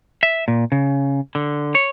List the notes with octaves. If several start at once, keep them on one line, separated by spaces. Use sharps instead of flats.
E5
A#2
C#3
D3
C#5